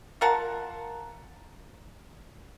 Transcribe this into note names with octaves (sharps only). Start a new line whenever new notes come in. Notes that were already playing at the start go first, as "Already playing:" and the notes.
F4 A#4 F#5 A5